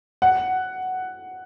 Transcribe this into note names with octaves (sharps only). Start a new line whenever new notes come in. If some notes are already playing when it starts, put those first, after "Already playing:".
F#5